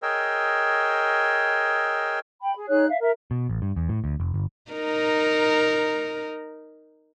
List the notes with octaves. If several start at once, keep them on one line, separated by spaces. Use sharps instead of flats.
G#4 A#4 C#5 D#5 G5 E6
G5 B5
G#4
D#4 G#4 C#5 F#6
E5 F5
A#4 E5
B2
A1
G2
E2
A2
D2
F1
G1
D#4 A#4